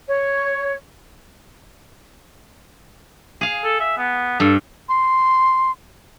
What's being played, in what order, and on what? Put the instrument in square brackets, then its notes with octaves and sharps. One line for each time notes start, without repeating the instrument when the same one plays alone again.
[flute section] C#5
[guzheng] G#4 F5
[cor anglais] A4
E5
B3
[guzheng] G2 [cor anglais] A4
[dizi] C6